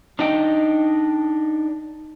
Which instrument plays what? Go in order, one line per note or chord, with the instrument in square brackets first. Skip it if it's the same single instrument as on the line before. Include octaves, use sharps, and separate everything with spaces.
[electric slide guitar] D4 D#4 D#5 G5